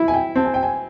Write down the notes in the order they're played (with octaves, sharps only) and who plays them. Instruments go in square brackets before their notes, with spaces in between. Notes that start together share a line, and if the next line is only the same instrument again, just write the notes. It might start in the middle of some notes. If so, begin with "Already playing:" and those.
Already playing: [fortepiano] E4
[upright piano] G#5
G5
[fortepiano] C4 [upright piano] A5
[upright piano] G#5
G5
G#5